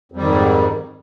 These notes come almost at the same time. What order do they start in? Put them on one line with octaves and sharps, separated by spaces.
F2 G3 D#3 G#2